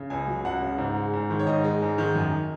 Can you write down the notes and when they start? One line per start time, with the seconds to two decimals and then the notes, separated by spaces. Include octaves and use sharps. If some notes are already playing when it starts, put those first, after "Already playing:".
Already playing: C#3
0.10 C#2 G#5
0.28 F#3
0.44 C#2 F#5
0.61 C#3
0.78 G#2
0.96 G#3
1.13 G#2
1.30 D#3
1.39 C#5
1.47 G#2 D#5
1.64 G#3
1.82 G#2
1.98 D#3
2.15 F#2